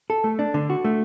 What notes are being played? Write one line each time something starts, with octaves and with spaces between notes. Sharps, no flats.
A4
A3
D4
D3
F#4
A3